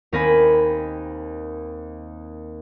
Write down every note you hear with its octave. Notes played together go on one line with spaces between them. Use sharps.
D#2 C4 A#4 D#5 G#5 B5